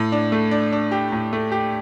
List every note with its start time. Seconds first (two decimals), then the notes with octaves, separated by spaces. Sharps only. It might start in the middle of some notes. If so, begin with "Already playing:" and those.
Already playing: A2
0.12 D4
0.32 A3
0.51 D4
0.72 D4
0.91 G4
1.12 A2
1.33 A3
1.52 G4